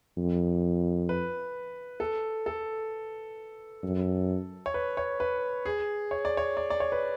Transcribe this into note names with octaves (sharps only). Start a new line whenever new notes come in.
F2
B4
A4
A4
F#2
C#5
B4
C#5
B4
G#4
C#5
D5
C#5
D5
D5
C#5
B4